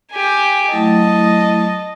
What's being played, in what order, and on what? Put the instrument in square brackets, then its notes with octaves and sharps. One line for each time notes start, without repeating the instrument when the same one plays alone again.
[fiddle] G4 G#5
[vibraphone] F#3 A3 E4 [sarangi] D#5 [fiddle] A5